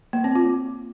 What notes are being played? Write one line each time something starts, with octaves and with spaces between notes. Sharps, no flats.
A#3
C4
F4